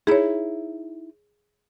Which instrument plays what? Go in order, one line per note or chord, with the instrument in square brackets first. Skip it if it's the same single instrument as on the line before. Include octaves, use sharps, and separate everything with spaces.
[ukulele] D#4 E4 [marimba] G#4 C#5